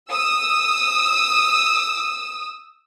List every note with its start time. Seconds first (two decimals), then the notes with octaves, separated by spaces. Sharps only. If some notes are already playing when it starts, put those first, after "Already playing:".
0.11 D#6 E6